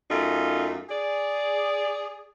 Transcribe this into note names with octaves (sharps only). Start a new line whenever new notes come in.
F#2 A3 D#4 F4
G#4 D5